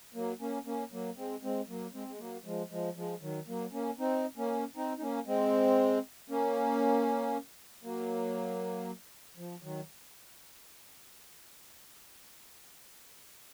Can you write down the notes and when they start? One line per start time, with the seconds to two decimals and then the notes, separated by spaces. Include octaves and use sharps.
0.14 F#3 A#3
0.40 A#3 C#4
0.66 A#3 C#4
0.92 F#3 A#3
1.17 G#3 C4
1.43 G#3 C4
1.69 F#3 A#3
1.94 G#3 C4
2.08 G#3
2.19 F#3 A#3
2.45 F3 G#3
2.71 F3 G#3
2.96 F3 G#3
3.22 D#3 F#3
3.48 F#3 A#3
3.73 A#3 C#4
3.99 C4 D#4
4.37 A#3 C#4
4.76 C4 D#4
4.98 D#4
5.01 A#3 C#4
5.27 G#3 C4
6.29 A#3 C#4
7.83 F#3 A#3
9.37 F3
9.63 D#3 F#3